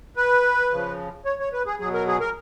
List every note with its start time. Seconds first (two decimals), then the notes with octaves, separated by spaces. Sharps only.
0.17 B4
0.71 C#3 F3
1.25 C#5
1.39 C#5
1.53 B4
1.66 G#4
1.79 B2 F#3 G#4
1.94 A#4
2.08 G#4
2.20 A#4